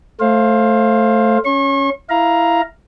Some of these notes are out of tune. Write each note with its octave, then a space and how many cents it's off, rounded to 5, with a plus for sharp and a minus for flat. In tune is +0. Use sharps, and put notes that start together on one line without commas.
A3 +0 C5 +25 F5 +0
C#4 +0 C#6 -35
E4 +5 F5 -5 A#5 +10